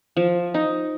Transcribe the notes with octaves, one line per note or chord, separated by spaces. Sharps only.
F3
D#4